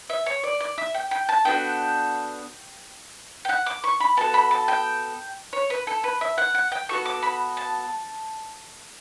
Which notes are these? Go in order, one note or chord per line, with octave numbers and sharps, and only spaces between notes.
E5
C#5
D5
D5
E5
G5
G5
A5
B3 D4 F#4 A4 G5
G5
F#5
D6
C#6
B5
B3 F#4 A4 A5
B5
A5
G5
C#5
B4
A4
B4
E5
F#5
F#5
G5
B3 F#4 A4 C#6
D6
B5
A5